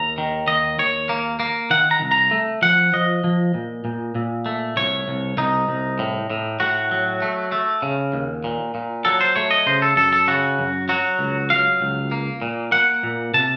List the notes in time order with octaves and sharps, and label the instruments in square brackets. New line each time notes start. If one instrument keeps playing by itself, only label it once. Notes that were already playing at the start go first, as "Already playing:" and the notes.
Already playing: [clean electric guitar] D#2 A#5
D#3
D#2 D#5
D#2 C#5
A#3
A#3
D#3 F#5
A#5
C2
A#5
A3
F3 F#5
F3 D#5
F3
A#2
A#2
A#2
A3
C2 C#5
C2
C2 D#4
C2
A2
A2
A2 F#4
F#3
A3
A3
C#3
D#2
A#2
A#2
F#3 A4
C5
A3 C#5
D#5
C#3 C5
A4
F#2 A4
A4
C#3 F#4
F#2
F#3 F#4
C#2
F#3 F5
C#2
A#3
A#2
A#3 F#5
A#2
C3 A5